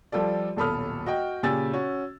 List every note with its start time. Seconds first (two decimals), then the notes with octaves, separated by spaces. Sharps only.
0.12 F3 G3 F4 A4 D5
0.56 D#1 B1 A4 B5 D#6 F6
1.06 F#4 D#5 G5
1.43 A#2 C#3 G4 G#5 E6 A6
1.73 C#4 F#4